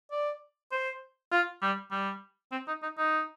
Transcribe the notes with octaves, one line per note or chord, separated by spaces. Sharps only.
D5
C5
F4
G3
G3
C4
D#4
D#4
D#4